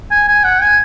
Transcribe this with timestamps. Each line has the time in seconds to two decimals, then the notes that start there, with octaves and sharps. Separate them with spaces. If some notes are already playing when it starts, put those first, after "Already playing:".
0.11 G#5
0.28 G#5
0.44 F#5
0.62 G#5